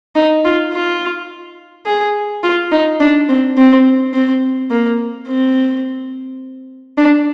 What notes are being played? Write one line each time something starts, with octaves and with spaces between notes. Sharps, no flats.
D#4
F4
F4
G#4
F4
D#4
D4
C4
C4
C4
A#3
C4
D4